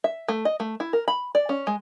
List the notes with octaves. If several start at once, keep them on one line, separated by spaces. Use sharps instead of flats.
E5
A3
D#5
A3
E4
A#4
B5
D5
C#4
G#3